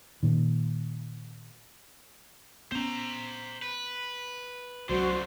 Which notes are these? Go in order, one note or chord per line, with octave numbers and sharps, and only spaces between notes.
A#2 D#3
B3 C#4 C5 A#5
B4
C2 F#2 D3 F#3 G#3 F#4 C5